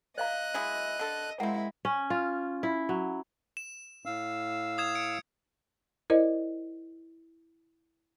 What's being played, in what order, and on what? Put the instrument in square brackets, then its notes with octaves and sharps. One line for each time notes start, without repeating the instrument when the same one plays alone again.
[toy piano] D5 F5 A#5 [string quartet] D#5 [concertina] F#6
[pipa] F#3 G#3 E4
D3 A4
[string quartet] G#3 E4 [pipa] A#3 C4 [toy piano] F#5
[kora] C#4
F4
E4
F#3
[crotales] E7
[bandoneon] A2 F5 E6
[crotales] D#6 G#6 E7
G#6 C#7 D7
[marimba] E4 A#4 C5 D5 D#5